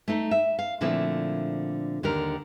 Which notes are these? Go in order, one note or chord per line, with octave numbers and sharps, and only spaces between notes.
A3 D#4
E5
F5
A#2 D3 F3 A3 C4 E4
D#2 D3 G4 A#4